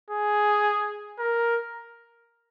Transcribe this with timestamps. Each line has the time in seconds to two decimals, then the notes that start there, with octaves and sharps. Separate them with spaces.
0.10 G#4
1.19 A#4